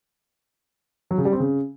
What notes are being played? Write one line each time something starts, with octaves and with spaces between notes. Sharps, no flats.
F#3
C#3
G3
C4
C#3